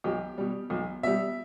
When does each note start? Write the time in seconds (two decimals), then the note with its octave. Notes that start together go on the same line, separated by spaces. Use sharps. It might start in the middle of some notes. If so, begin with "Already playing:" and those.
0.04 B1 G4
0.38 B2 G3
0.70 B1
1.03 B2 G3 E5